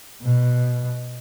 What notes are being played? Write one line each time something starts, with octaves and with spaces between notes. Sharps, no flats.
B2